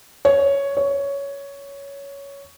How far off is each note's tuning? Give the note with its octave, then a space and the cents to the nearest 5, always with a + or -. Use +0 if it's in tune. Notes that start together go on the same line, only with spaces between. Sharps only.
C#5 +5
C#5 +10